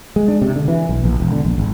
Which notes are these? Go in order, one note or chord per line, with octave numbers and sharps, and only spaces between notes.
G#3
D4
C3
D3
E3
B1
A#1
E1
D3
A#1
G#1